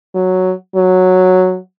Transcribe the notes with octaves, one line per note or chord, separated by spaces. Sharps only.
F#3
F#3